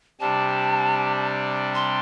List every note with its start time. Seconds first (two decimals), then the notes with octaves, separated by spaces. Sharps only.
0.20 C3 G3 D4 A5
1.75 C6